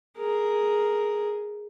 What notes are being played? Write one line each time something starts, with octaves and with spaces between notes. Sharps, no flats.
G#4 A#4